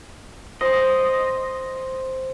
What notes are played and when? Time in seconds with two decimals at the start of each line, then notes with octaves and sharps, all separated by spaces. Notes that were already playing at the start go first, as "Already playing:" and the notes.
0.61 C5 D#5